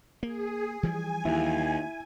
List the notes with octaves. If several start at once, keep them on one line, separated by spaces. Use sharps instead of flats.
A#3 G#4
E3 F3 G3 G#5
D#2 E4